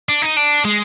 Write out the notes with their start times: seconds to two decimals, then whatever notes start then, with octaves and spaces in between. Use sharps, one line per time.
0.09 D4
0.22 D#4
0.37 D4
0.65 G#3